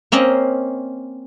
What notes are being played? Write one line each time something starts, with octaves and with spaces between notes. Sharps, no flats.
A#3 C4 C#4 D#5